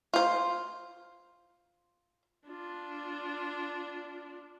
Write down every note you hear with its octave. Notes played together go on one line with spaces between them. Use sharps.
F4 C5
D4 F4